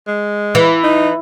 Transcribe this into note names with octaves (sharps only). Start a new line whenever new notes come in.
G#3
E3
D#4